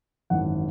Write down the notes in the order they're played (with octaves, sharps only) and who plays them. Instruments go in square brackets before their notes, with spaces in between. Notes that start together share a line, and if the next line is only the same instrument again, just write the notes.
[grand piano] G#1 F#2 E3 F#5